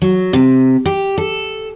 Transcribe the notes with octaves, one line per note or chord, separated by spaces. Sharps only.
F#3
C3
G4
A4